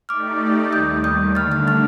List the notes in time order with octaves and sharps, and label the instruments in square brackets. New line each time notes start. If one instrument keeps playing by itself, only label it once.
[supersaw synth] A3 D#4 G4 D5 [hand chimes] D6 F6
[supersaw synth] D#2 D#3 G3 [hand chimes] D#6 G6
[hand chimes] D#6 G6
[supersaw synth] D3 A3 D4 [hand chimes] F6 A6
[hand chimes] F6 A6
F6 A6